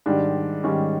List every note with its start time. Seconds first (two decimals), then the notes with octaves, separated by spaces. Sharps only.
0.06 G#2 D#3 G3 D4
0.64 G#2 D#3 G3 C#4